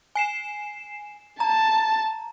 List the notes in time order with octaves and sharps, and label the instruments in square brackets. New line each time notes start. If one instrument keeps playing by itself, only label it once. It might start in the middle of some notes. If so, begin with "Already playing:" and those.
[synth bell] G#5 C7 E7
[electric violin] A5 [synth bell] A#5